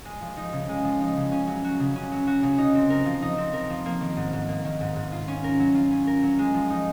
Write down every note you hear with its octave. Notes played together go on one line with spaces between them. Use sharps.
G#3
F3
D#4
C#3
G#3
F3
D#4
C#3
C#4
F#3
F#4
C#3
C#4
F#3
F#4
C#3
D#4
C4
A#4
F3
D#4
C4
A#4
F3
A#3
D#3
G#2
G#2
A#3
D#3
G#2
G#2
F4
C#4
A#4
F#3
F4
C#4
A#4
F#3
G#3
F3
D#4